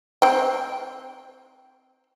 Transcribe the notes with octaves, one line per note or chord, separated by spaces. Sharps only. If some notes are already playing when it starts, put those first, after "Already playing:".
C4 G5